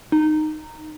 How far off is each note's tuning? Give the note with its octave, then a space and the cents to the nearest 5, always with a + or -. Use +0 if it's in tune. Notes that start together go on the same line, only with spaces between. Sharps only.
D#4 -15